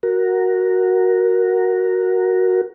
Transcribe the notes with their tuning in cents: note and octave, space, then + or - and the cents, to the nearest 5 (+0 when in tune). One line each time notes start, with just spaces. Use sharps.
F#4 +0 A#4 +0